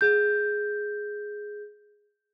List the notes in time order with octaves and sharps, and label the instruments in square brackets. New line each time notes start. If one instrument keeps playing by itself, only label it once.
[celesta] G#4 G6